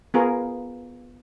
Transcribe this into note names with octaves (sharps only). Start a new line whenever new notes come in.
B3 F4 G#4 A#4